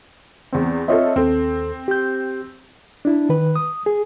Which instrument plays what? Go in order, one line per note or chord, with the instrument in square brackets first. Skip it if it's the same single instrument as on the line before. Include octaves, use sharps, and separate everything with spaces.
[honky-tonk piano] E2 C4
[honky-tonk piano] C4 F4 A4 [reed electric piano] C#5 D#5 E5
[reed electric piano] D#2 A4 [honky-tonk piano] C4
[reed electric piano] G4 G6
D4 E4
D#3 B4
D#6
G#4